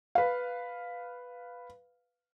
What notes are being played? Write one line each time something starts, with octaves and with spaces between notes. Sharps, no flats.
B4 F5